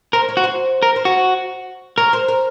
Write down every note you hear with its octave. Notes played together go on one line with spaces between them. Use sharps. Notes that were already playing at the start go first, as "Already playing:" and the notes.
A#4 C5
C#5
F#4
C5
A#4
C5
F#4 C#5
A#4 C#5
C5
A#4